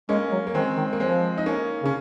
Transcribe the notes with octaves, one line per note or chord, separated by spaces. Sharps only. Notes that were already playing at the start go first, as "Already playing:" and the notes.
G#3 A#3 C#4
F#3
A#3
D#3 G#3 C4
D#3
A#3
F3 G#3 C4
D#4
A#3 C#4
C#3 C#4